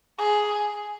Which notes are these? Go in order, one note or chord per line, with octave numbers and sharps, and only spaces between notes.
G#4